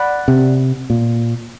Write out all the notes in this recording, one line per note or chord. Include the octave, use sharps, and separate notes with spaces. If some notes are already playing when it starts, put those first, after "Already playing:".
Already playing: D5 F#5 B5
C3
A#2